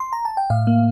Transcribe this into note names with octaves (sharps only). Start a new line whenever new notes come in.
C6
A#5
A5
G5
A2 F5
A#3